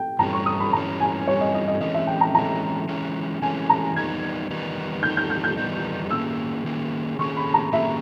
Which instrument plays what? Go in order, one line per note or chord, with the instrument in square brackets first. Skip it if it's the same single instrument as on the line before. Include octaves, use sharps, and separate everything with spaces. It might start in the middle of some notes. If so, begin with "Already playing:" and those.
Already playing: [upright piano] G5
[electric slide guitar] G2 E3 G3 C#4 [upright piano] A#5
[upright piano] C#6
D#6
B5
[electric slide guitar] G2 E3 G3 C#4 [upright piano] A#5
[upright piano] G#5
[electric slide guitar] G2 E3 G3 C#4 [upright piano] C#5
[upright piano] D#5
D#5
D#5
[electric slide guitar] E3 G#3 C#4 [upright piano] D#5
[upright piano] E5
G5
A#5
[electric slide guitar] E3 G#3 C#4 [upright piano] A#5
[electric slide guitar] E3 G#3 C#4
[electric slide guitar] E3 G#3 C#4 [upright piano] G#5
[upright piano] A#5
[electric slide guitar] E2 D#3 G3 B3 D#4 [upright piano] G#6
[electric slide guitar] E2 D#3 G3 B3 D#4
[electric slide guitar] E2 D#3 G3 B3 D#4 [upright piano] G6
[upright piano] G6
G6
G6
[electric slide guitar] E2 D#3 G3 B3 D#4
[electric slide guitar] D#3 A#3 C#4 G#4 [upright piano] E6
[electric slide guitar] D#3 A#3 C#4 G#4
[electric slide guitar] D#3 A#3 C#4 G#4 [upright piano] C#6
[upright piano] B5
A#5
[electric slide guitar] D#3 A#3 C#4 G#4 [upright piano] E5